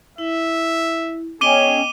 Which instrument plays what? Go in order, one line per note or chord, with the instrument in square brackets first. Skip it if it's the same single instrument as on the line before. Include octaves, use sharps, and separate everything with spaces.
[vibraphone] E4 [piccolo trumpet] E5
[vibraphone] B3 D#5 G5 [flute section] C#4 [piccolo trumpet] G#4 [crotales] D6 D#7 G7